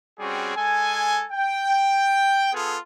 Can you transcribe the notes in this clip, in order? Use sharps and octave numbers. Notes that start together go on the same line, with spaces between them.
G3 C4 C#4 F#4 G#4
G#3 A4 G#5
G5
B3 F4 G#4 A4